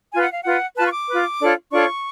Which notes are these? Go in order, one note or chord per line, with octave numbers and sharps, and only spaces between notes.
F4 B4 G#5
F#5
F5
F4 B4 F#5
F4 B4 A5
C#6
D6
F4 B4
D4 F4 A4 C#5
D4 F4 A4 C#5 C#6